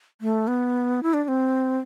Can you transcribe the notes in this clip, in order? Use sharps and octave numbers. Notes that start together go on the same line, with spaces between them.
A3
B3
E4
D4
D4
C4